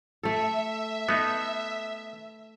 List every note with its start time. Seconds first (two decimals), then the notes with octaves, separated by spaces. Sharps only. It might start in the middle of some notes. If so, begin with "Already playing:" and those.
0.23 A3 A4 E5
1.09 A3 B3 D#4